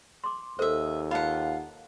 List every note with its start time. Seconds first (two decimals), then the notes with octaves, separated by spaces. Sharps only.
0.24 C6 D6
0.59 D#2 A4 A#4 C5 D#5 E5
1.11 F4 F5 F#5 A5 B5